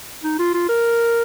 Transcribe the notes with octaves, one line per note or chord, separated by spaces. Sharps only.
D#4
F4
F4
A#4